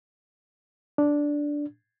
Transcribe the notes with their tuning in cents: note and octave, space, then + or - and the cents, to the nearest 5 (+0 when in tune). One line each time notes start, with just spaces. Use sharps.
D4 -5